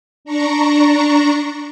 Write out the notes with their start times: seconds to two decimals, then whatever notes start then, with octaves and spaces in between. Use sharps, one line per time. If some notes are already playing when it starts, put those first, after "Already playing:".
0.25 D4 A#5 C#6